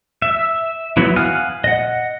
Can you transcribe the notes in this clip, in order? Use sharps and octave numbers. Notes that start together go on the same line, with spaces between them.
E5
E3 F#3 B3 E4
F5 F#5 G#5 D#6 F6
D#5 F#5